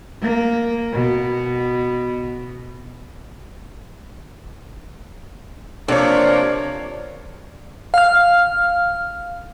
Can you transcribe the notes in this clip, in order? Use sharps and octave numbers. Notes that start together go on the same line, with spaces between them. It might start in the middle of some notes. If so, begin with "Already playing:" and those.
A#3
B2
C3 F3 A3 A#3 D4 C#5 D5
F5 F6